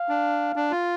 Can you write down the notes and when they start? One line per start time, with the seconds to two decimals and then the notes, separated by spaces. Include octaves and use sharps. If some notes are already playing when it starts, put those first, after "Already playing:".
Already playing: F5
0.09 D4
0.56 D4
0.71 F4